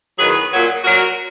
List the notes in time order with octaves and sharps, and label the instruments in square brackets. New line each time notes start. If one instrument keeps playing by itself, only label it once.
[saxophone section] E2 D#3 F#3 G#4 B4
A#2 F#3
A#2 F#3 F#4 A#4